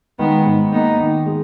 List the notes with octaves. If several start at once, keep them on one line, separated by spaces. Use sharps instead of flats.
D#3 G#3 B3
G#2
A#3 B3 D#4
D#3
G#3